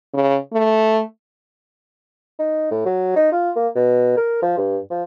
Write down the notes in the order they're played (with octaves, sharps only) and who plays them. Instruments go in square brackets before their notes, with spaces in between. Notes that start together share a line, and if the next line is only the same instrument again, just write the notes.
[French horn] C#3
A3
[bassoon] D#4
A2
F#3
D#4
F4
A#3
B2
A#4
F3
G2
F3